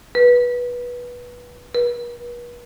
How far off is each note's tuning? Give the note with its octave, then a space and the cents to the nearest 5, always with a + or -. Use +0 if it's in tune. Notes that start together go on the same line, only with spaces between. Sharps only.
B4 -20
B4 -40